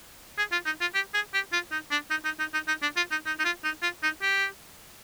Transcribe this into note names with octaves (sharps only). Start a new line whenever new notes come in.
G#4
F4
D#4
F4
G4
G#4
G4
F4
D#4
D4
D#4
D#4
D#4
D#4
D#4
D4
F4
D#4
D#4
D#4
F4
D#4
F4
D#4
G4